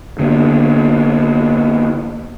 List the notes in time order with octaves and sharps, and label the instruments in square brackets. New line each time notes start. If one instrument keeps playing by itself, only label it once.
[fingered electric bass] D3 A#3 B3